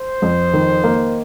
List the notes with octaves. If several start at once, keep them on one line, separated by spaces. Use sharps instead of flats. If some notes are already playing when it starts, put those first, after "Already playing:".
Already playing: C5
F2
D#3
A#3